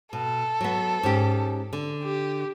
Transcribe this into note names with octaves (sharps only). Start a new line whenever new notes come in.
B2 A4
F#3 B3
G#2 C#4 G4
D3
G4